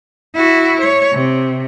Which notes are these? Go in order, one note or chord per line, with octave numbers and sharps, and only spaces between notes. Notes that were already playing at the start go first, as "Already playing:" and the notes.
E4 F#4
C#5
C3